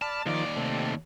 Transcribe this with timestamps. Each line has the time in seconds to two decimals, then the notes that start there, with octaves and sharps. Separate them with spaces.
0.02 D5 A5 B5 F6
0.26 D#2 D#3 F3 D5
0.56 C3 A3